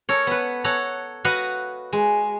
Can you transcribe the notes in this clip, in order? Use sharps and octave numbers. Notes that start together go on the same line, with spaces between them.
A4 A#4 C#5
B3 B4
A4 C#5 F#5 A#5
F#4 B4 D#5 F5 F#5
G#3